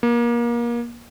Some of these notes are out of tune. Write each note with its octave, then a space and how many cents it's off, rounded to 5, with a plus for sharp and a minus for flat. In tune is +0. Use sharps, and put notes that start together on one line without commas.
A#3 +30